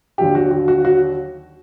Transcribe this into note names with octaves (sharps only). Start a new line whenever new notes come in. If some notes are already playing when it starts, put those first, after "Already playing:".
D#2 D3 F#3 G4
F#4
F#4
F#4
F#4